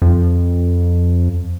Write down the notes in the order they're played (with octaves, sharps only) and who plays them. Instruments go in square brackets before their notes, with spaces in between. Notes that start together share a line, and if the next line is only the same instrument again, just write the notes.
[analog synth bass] F2